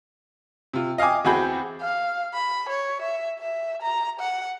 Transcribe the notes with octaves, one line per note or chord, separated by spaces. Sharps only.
C3 F4
D#5 F5 G5 G#5 D6
E2 C4 F#4 G#4 B5 G6
F5
B5
C#5
E5
E5
A#5
F#5